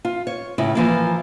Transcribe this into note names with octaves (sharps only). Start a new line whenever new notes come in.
F4
C#5
A2 C#3 E4
E3 F3 A#3